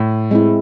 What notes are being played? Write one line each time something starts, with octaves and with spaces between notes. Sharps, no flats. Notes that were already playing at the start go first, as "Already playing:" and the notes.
Already playing: A2
G#3 C4 E4